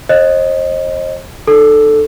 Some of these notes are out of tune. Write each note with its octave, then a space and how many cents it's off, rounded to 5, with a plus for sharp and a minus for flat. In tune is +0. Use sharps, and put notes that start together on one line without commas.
C5 +40 D#5 +0
D#4 -45 A4 +0